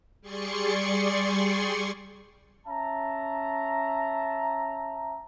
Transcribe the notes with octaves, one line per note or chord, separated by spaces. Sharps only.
G3 G#4 D5 C6 C#6 C#7
C#4 E5 A5 A#5